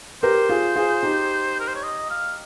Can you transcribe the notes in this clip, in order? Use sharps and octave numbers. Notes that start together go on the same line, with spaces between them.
G4 A#4 C5
F4 G#4
F4 G#4
D#4 G4
A#4
C5
C#5
D#5
F5